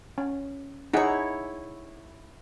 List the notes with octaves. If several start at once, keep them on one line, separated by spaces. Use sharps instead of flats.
C#4
D#4 E4 G#4 C#5 F#5